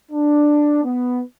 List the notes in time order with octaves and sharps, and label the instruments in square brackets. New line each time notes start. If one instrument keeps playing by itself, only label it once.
[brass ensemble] D4
B3